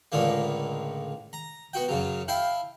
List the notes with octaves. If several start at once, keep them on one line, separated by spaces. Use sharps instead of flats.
C#2 A2 D3 G#3 A#3
A#5
B3 F#4 G5
F#2 C#3 F#3
E4 F5 G5 A5